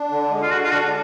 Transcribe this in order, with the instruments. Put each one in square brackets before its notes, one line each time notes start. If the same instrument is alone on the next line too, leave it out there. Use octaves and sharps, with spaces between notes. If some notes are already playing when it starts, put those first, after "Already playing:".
Already playing: [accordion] D4
D3
G#3
[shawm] F4
[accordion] D3 [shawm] F#4
[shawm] F4
[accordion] D4 [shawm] F#4